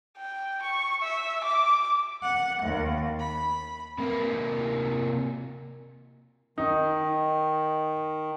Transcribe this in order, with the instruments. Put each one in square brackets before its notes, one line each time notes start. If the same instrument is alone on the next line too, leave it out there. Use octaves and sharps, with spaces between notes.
[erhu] G5
C#6
E5
D6
[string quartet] F#5
D#2
B5
[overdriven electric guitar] C3 A#3
[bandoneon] D#3 [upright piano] D#4